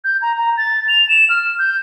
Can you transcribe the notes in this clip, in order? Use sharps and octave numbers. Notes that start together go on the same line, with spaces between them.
G6
A#5
A#5
A6
F7
E7
F6
G6